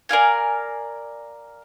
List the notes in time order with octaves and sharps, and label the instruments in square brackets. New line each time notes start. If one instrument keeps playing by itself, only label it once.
[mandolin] A#4 D5 F5 G#5